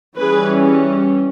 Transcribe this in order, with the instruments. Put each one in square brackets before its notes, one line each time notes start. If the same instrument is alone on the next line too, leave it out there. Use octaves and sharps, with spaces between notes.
[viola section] E3 G3 C#4 G#4 B4